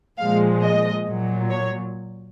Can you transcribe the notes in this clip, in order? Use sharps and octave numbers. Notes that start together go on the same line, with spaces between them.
A#2 F3 G#3 F5
D#5
A#2 F#3
C#5